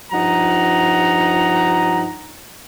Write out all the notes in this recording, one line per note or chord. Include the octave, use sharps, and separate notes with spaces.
G2 F3 D#4 F#5 A#5